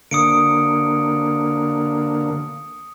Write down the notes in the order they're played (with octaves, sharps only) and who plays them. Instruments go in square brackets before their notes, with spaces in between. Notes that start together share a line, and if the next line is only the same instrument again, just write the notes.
[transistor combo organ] D3 A#3 [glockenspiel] D#6 C#7 D7